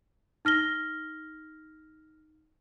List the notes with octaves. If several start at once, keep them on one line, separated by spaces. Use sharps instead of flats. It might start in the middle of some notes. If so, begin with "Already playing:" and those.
D#4 F6 A#6 G7